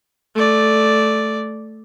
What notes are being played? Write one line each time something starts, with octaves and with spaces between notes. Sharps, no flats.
A3 D5